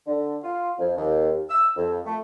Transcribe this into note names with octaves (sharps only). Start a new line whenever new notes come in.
D3
F4
F2
D#2
E6
F2
A3